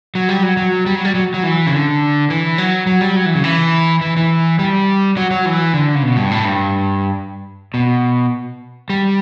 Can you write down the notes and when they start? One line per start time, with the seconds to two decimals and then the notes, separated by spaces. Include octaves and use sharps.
0.15 F#3
0.29 G3
0.43 F#3
0.57 F#3
0.86 G3
0.96 F#3
1.05 G3
1.15 F#3
1.34 F#3
1.43 E3
1.66 C#3
1.72 D3
2.30 E3
2.58 F#3
2.87 F#3
3.01 G3
3.16 F#3
3.26 E3
3.35 C#3
3.44 E3
4.01 E3
4.17 E3
4.59 G3
5.17 F#3
5.31 F#3
5.46 E3
5.74 D3
5.95 C#3
6.03 B2
6.17 G2
6.31 A2
6.45 G2
7.74 B2
8.90 G3